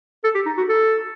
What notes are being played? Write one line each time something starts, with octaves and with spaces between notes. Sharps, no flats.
A4
G4
D#4
F#4
A4